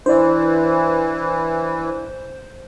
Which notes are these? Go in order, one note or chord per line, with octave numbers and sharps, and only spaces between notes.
E3 D4 E4 C5 D5